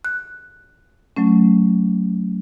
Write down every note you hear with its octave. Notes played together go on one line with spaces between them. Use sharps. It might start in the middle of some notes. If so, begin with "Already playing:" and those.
F#6
F#3 A3 C#4